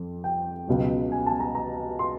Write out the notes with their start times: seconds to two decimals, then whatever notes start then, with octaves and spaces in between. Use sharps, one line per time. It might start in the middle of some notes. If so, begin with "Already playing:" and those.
Already playing: F2
0.24 G5
0.67 C#2 B2 F#3
1.12 G#5
1.27 A5
1.40 A#5
1.55 A#5
1.99 C6